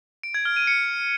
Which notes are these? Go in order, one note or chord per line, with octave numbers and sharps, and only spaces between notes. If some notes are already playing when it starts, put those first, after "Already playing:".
D7
G#6
F6
D#7
C#7